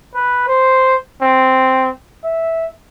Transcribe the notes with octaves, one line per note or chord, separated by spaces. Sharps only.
B4
C5
C4
E5